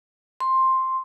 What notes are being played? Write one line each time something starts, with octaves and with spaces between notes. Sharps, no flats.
C6